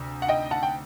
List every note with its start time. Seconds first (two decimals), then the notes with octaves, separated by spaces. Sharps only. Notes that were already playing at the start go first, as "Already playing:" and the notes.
Already playing: D2 C3
0.22 F#5
0.29 D#5 G5
0.51 F#5 A5
0.63 G5